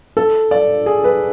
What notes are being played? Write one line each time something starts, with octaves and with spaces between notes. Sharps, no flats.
A4
D5
G#4
B4